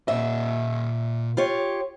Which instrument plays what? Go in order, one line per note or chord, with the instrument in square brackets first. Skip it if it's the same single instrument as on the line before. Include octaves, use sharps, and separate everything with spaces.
[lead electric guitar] A#2 D#5 [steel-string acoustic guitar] E5
[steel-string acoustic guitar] F4 G4 C#5